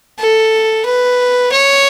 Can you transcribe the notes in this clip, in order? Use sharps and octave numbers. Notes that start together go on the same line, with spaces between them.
A4
B4
C#5